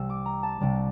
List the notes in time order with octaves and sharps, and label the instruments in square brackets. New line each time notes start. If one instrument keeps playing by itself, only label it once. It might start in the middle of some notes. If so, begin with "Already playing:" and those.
Already playing: [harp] C2 C3 G3 E6
D6
A#5
A5
C2 C3 G3 D5